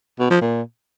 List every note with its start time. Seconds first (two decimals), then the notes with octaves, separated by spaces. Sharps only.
0.20 B2
0.30 F3
0.41 A#2